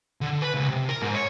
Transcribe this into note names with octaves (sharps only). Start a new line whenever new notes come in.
D3
B4
C#2
C3
A#4
G#2
C#5